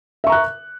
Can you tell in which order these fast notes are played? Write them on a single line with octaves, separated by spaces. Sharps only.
E5 C#6 A#5 F#6